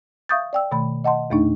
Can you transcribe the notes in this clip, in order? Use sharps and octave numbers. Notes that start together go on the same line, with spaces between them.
E5 F5 C#6 D#6 G6 A6
D5 G5 E6
B2 D#3 A3 B5
D#5 F#5 A5 C6
E2 A#2 A3 D4 D#4